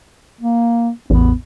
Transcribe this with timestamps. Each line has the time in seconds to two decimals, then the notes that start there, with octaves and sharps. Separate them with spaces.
0.41 A#3
1.10 A1 E2 B3